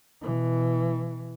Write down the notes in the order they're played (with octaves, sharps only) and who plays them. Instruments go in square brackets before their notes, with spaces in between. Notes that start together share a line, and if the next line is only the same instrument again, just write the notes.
[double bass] B2 E3